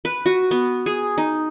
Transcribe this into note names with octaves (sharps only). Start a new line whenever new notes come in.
B4
F#4
B3
G#4
D#4